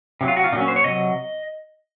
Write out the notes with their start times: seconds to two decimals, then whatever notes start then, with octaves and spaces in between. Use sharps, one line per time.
0.21 C3 F#3
0.28 F4
0.37 F#4
0.44 F4
0.52 A#2 D#4
0.56 F#3 C#4
0.68 C5
0.76 C#5
0.84 C3 F#3 D#5